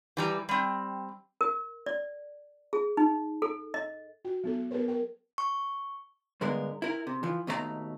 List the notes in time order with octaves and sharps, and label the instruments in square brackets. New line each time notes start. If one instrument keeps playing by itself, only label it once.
[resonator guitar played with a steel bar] E3 G3 A#5
G3 C4
[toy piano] A#4
D5
G#4
D#4
A4
D#5
[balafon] F#4 G5
F#3 B3 A4
B3 G#4 A#4 B4 C#5
A#4 G5
[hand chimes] C#6
[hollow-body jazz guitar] G2 D3 G#3 B3 A#4
E4 A#4
C3
E3 F3
D#2 B2 A3 G4 A#5